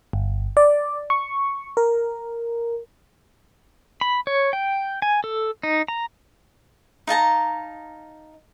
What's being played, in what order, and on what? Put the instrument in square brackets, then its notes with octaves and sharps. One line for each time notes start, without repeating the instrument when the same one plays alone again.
[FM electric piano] G1
D5
C#6
A#4
[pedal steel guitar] B5
C#5
G5
G#5
A4
D#4
A#5
[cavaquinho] D#4 F5 A5 A#5